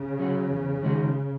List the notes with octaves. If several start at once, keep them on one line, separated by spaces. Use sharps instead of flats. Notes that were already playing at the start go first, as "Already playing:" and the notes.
Already playing: C#3
F#3 C#4 F#4
E2
D#3 G#3 D#4 F#4